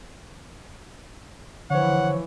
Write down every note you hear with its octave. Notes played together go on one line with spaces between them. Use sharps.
D3 E3 F3 C5 C#5 F#5